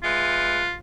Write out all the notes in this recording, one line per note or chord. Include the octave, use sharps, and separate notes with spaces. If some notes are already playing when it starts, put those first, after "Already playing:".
G#3 F4 B4 E5